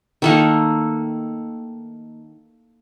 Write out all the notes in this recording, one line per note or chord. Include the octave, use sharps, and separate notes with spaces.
D#3 A3 A#3